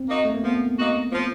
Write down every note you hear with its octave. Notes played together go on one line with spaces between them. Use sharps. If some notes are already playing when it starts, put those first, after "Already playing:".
Already playing: C4
A#3 D#4 F#4
A3
A#3
F3 B3
A#3 D#4 F#4
F3